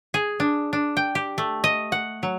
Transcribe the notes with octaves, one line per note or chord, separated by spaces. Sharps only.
G#4
D4
D4
G5
G4
A3
D#5
F#5
F#3